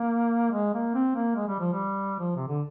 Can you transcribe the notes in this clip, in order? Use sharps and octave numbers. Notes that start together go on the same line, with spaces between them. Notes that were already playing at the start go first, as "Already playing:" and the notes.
Already playing: A#3
G#3
A#3
C4
A#3
G#3
G3
F3
G3
F3
C3
D3